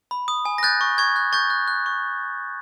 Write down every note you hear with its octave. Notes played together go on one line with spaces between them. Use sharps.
B5
D#6
G#5
A#6
F#6 G6 A6
C#6
C#6 G#6
F#6
C#6 G6 A6
F#6
F#6
C#6